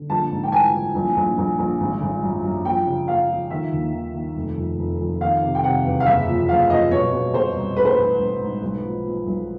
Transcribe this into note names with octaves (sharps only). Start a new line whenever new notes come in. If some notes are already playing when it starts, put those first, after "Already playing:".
Already playing: D3
A#1 A5
G#2
G5
E3 G#5
E3
A#1
A#1
A#1
A#1
G#1
G#1
F#2
F#2
F3 G5
C#3
F3 F5
F3
D#3 E5
D#2
D#3
D#3
F1
F2
F1
F2
D#3 F5
C3
G5
C3 F#5
E2
F5
F#1 E5
F3
F#1 F5
F3 D#5
B2 C#5
B2
B2 C5
C2
A1 B4
C5
A1 B4
A1
G#2
B1
F3
F3
B1